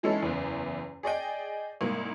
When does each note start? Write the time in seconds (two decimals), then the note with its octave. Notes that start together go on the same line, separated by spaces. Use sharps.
0.03 E3 G#3 C#4 D#4 E4 A4
0.22 F#1 E2
1.03 G#4 D5 D#5 G5
1.81 C2 G#2 A#3